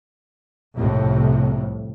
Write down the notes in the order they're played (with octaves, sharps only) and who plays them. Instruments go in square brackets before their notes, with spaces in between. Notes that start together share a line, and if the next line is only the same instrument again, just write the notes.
[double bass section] C2 F2 A2 C3